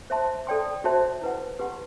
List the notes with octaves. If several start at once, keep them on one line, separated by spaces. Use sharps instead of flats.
C5 E5 A5 C6
A4 D5 G5 C6
F#4 C5 E5 A5 C6
E4 B4 F#5
G4 B4 F#5 C6